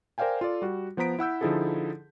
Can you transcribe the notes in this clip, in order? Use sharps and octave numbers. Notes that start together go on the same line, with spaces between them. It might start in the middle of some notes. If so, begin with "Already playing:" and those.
A#4 C5 D5 F5 G5 G#5
F4 A4 D5
G3 F#4
F3 B3 C5 A#5 B6 D7
E4 F#5 E6 G6
D3 F3 D#4 E4 G#4 A4